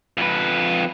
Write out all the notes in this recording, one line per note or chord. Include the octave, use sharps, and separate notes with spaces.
F2 B4